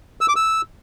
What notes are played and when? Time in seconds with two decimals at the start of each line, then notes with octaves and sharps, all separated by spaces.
0.21 E6
0.29 D6
0.36 E6